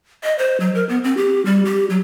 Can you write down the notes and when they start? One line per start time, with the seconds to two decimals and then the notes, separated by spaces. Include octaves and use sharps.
0.24 D#5
0.39 C5
0.60 F#3
0.75 A#4
0.89 B3
1.04 C4
1.17 G4
1.45 G3
1.65 G4
1.90 F#3